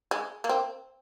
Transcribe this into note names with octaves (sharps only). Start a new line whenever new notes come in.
G#3
A#3
C4